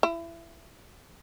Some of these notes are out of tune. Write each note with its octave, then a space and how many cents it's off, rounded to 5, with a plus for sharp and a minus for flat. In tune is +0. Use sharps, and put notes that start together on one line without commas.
E4 +25